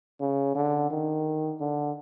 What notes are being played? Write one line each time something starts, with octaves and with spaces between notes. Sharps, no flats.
C#3
D3
D#3
D3